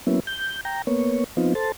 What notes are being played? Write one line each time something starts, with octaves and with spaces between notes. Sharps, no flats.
F#3 A#3 B3 C#4 E4
G6
G5 A#5
A#3 B3 C#5
F3 B3 C4 D#4 F4
A4 C5 A5